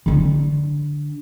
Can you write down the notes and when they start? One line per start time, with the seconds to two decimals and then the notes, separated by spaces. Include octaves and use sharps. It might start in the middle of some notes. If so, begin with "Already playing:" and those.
0.06 D3 D4